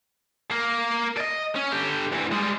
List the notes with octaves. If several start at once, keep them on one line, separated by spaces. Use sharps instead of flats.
A#3
D5 D#5
C#4
D3 G4
D2 E3
G3 G#3